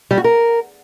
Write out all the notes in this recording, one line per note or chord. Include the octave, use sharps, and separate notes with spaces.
G3
F#4
A#4